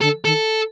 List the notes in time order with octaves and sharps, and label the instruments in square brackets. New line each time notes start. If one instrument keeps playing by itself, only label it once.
[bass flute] D3 [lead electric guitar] A4
[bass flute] D#3 [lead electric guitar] A4